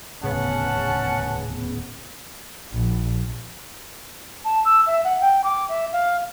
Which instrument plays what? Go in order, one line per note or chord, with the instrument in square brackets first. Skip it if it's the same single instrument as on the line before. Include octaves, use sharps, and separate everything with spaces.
[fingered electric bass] D#1 A2 [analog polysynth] C#3 B3 [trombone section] C#4 [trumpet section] F#5 A5
[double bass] A#1
[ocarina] A5
E6
E5
F#5
G5
D6
E5
F5